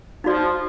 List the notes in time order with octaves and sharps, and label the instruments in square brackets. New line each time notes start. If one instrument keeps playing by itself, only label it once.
[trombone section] F3 [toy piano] D#4 F#4 D5